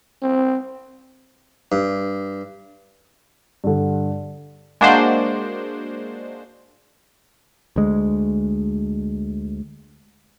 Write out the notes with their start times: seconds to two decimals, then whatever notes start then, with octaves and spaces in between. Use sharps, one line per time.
0.22 C4
1.72 G2
3.64 G2 D3
4.81 G#3 A#3 D4 F#4 C5
7.76 D2 G#3